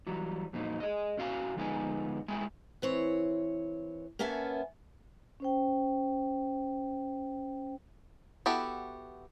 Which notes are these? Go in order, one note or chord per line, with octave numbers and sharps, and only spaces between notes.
E3 F#3 G3
F2 A#2 F#3 D#4
G#4 D#5
A2 C#4 F#4 F5 G#5
D2 F3 G#3 B3 D#4 G#5
G#3 A3 E4 G5 G#5
E3 C4 C#5
A#3 B3 C#4 E5 G#5 A5
C#4 C5 G5
B3 E4 F#4 G4 A4